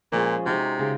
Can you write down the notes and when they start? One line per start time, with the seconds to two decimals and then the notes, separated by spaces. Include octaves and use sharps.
0.12 A#2 F3 G#3 C#4 G#4
0.46 C3 G#3 D#4 F#4
0.79 C#3 G#3 D#4